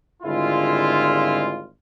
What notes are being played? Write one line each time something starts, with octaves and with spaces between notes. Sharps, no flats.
G#1 D3 G3 G#3 E4 F4